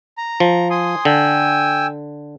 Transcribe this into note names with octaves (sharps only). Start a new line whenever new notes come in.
A#5
F3
G#5 C6 D#6
D3 G5 G#5 E6